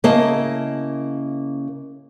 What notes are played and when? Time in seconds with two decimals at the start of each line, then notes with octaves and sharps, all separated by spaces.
0.04 C#3 A#3 E4 D#5 A5